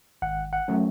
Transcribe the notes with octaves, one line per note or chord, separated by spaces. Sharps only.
G#1 F#5
F#5
F#3 A3 C#4